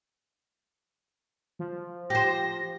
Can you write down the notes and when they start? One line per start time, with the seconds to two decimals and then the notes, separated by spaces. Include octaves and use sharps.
1.59 F3
2.10 G4 C5 A#6